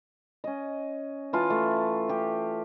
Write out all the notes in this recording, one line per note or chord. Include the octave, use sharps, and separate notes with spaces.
C#4 D#5
E3 F4 A5
A3
G4